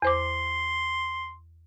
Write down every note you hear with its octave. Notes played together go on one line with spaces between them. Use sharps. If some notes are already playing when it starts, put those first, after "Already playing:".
E2 C5 C6 D6